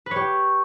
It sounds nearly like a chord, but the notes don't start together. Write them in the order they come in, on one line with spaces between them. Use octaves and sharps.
B4 C#5 G4